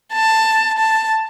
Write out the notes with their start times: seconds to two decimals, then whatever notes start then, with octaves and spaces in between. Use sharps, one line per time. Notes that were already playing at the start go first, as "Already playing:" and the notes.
0.13 A5
0.78 A5